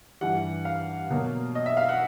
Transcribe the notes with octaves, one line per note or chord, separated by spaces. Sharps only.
G2 E3 G3 F#5
F5
B2 F#3 A#3
D#5
E5
F5
F#5